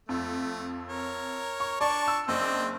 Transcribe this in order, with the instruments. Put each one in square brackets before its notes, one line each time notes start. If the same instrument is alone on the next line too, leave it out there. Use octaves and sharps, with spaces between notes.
[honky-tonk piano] F2 [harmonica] A3
[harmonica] A#4 C#5
[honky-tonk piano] C#6
[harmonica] D4 A5 C#6 [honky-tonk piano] D5
[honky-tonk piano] E6 E7
[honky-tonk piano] F#1 [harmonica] C4 D4 D#5